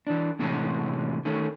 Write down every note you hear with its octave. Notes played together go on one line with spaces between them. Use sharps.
E3 D4
A2 C3 E3 G#3 C#4
D#3 A3 C#4